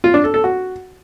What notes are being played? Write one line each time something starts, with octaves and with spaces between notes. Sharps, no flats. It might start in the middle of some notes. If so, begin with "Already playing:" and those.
F4
D4
A4
A4
F#4